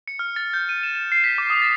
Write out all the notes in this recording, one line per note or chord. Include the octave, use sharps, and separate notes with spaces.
C#7
F6
A6
G6
D#7
E7
E7
C7
B6
D6
D#6
A6